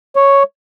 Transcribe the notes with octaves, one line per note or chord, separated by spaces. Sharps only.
C#5